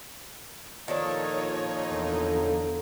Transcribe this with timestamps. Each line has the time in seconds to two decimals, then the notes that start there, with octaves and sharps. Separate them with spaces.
0.88 A#2 D#3 F3 D4 D#4 A4 C#5
1.90 E2 D3